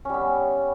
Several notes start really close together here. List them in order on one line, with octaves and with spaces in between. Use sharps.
C#4 G3 B3